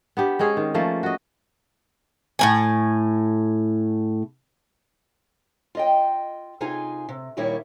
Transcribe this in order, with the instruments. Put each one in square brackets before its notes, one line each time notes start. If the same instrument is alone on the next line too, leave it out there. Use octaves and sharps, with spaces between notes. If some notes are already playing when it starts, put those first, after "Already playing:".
[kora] B3 D4 G4
G#3 C4 C#4 G#4
D#3
F3 A3 A#3 C#4
F#4 D#5
[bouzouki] A2 A#3 G#5
[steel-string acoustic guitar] F4 D#5 G5
C3 D#4 F4 G#4 G#5
C3
D#2 A#2 D#3 G3 E4 C#5